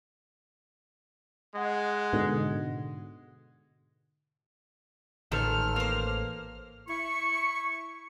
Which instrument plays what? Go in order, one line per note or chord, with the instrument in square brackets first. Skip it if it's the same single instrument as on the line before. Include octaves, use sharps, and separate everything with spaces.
[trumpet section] G#3 F#5
[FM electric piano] G#2 B2 D3
[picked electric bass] A1 [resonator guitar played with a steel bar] A#2 D#3 A4 [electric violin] F6
[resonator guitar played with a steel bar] A#3 C5
[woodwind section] E4 C#6